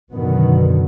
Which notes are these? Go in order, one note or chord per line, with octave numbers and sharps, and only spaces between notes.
F#2 B2 D3 D#3 F#3 B3